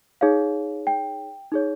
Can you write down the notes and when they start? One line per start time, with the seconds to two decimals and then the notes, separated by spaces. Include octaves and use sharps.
0.21 D#4 G#4 C#5 F5
0.87 G5
1.52 D#4 G#4 C#5